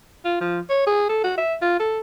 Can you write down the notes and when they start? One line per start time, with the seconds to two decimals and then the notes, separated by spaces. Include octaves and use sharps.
0.25 F4
0.41 F3
0.70 C#5
0.87 G#4
1.09 A4
1.24 F#4
1.38 E5
1.62 F4
1.80 A4